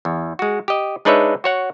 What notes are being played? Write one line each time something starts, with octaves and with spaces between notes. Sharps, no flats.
E2
G#3 F#4
G4 D#5
G#3 D4 D#4 B4 C#5 E5
F#4 C#5 F#5